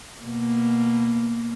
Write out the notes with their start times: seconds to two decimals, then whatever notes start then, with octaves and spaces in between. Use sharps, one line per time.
0.23 B2 A#3